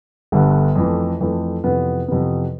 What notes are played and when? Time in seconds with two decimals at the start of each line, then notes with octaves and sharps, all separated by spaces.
0.32 G1 G2 D3
0.76 F2 E3 A3
1.20 F2 E3 A3
1.64 F2 C3 E3 B3
2.08 F2 C3 E3 B3